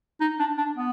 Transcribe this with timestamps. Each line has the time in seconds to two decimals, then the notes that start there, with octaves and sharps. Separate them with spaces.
0.20 D#4
0.39 D4
0.58 D4
0.77 B3